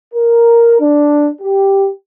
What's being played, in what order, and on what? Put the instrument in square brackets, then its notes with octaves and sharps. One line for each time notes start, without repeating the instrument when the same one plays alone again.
[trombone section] A#4
D4
G4